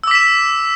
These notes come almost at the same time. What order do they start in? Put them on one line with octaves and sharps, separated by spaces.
E6 D6 B6 E7